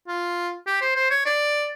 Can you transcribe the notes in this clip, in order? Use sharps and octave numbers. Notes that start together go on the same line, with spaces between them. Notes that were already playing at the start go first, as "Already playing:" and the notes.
F4
G4
C5
C5
C#5
D5